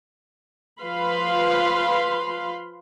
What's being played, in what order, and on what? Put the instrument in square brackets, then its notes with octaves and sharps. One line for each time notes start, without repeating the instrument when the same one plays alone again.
[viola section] F3 B4 F5 B5 C6